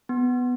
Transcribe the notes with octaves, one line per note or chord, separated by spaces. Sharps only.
B3